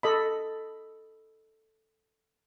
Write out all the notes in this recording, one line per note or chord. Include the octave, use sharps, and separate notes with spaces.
A4 D#5 B5